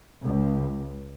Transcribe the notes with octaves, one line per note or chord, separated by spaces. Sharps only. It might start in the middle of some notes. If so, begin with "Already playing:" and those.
C#2